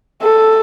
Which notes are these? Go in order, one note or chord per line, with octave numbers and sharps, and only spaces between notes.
A4